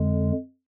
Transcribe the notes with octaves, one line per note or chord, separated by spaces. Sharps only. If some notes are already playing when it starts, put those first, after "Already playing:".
Already playing: F2 D3 G#3